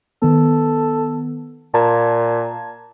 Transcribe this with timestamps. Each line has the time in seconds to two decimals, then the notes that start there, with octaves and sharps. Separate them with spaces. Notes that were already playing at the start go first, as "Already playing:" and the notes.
0.22 D#3 B3 A4
1.74 A#2 A5 A#5 G#6